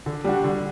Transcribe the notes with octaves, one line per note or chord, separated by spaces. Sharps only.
D3
G3 D4 F#4
D3